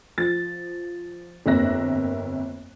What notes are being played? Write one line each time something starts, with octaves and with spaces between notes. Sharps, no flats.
F3 A6
G1 F2 A#3 E5 F#6 A#6